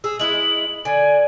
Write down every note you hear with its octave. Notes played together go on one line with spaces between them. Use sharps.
G#4 E6
G#3 E4 F#7
D3 G#5